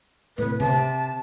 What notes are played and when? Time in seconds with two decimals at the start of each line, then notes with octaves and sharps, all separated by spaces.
0.38 A2 C3 B4
0.60 C3 A5